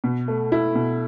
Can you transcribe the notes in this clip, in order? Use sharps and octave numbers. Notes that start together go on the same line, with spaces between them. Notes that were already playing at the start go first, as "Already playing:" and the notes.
B2
A3
E4
B2